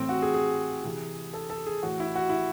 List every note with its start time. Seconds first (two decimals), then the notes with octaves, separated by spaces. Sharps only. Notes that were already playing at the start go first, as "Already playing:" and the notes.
Already playing: A2 E3 C4
0.09 F#4
0.22 G#4
0.34 G#4
0.84 C3 E3
1.34 A4
1.50 A4
1.66 G#4
1.83 A2 E3 F#4
2.00 E4
2.15 F#4
2.29 E4